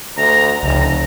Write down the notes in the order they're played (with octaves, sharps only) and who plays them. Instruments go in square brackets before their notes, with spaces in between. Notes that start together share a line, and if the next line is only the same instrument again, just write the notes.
[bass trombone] D2 [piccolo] A#5
[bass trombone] F1 [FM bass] C#2 [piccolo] A#5